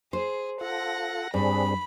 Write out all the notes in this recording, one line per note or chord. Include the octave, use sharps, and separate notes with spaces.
G#4 C5
F4 A4 F#5 A#6
G2 G3 C4 D4 G#4 B5